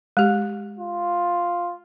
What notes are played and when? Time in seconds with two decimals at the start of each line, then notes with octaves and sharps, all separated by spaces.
0.17 G#3 G4
0.78 F4